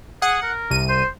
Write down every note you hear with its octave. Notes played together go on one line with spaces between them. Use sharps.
G#4 F#5
A#4
C2 D#7
C5